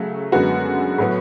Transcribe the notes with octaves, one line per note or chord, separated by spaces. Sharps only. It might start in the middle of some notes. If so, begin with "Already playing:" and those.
Already playing: C#3 F#3 A3
F#2 D3 G#3 B3 F#4
A2 F#3 B3